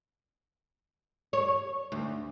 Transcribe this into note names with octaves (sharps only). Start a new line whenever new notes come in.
C#5
D2